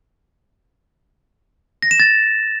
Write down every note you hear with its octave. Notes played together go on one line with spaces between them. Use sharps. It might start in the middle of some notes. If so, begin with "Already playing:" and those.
A#6
E7
A6